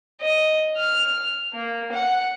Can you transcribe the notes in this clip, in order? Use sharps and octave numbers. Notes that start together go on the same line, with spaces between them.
D#5
F6
A#3
F#5